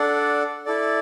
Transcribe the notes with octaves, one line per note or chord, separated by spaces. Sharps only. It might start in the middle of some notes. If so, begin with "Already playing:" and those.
Already playing: D4 A4 D5 F#5
E4 A4 D5